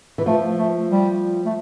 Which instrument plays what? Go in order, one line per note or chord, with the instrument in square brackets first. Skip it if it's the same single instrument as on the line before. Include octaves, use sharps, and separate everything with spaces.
[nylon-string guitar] E3
[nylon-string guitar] F3 [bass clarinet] A3
[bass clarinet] A3
G3
A3